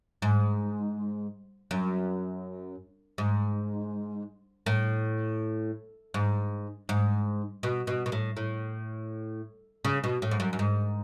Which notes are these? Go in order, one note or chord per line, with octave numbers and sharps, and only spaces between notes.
G#2
F#2
G#2
A2
G#2
G#2
B2
B2
B2
A2
A2
C#3
B2
A2
G#2
F#2
F#2
G#2